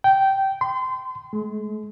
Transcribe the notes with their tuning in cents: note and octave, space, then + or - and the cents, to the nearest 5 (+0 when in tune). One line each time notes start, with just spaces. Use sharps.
G5 -15
C6 -30
G#3 +40